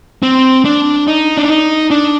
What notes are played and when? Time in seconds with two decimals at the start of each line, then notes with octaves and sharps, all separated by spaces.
0.23 C4
0.65 D4
1.08 D#4
1.37 D4
1.49 D#4
1.91 D4